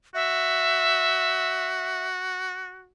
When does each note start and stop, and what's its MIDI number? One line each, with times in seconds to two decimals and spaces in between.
0.14 2.92 66
0.14 2.07 76